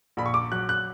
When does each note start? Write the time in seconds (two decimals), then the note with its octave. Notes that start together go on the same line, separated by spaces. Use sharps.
0.17 A#1 B5
0.26 C#6
0.34 D6
0.52 F#3 F#6
0.69 F#6